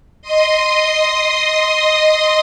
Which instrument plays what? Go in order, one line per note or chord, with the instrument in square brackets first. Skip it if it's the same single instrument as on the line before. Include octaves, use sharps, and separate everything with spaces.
[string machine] D#5 C6 D#6